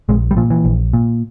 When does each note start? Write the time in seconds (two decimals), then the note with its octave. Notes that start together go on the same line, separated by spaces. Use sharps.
0.09 A#1 G#3
0.31 G3
0.37 A#2 F3
0.50 E3
0.64 A#1
0.93 A#2